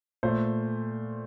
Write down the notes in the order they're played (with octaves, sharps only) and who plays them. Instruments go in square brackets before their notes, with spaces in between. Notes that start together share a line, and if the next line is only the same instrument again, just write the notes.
[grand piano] A#2 A3 C5